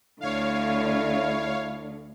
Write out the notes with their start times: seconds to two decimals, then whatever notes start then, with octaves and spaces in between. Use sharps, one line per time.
0.21 D2 D3 E4 C#5 F5